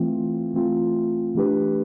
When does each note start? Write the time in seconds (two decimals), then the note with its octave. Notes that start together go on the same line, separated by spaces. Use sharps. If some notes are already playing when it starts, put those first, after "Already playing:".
Already playing: E3 A3 C4 F4
0.54 E3 A3 C4 F4
1.35 E3 A3 D4 G4 B4